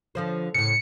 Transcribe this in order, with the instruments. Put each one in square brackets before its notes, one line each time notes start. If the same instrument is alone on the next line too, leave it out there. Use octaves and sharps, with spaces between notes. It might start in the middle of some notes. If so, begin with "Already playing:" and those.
[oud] D3 F3 C5
[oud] A2 C#3 [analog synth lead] C#7